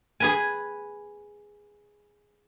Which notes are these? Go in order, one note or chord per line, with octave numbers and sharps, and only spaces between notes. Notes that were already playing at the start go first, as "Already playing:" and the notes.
G#4 B4 G#5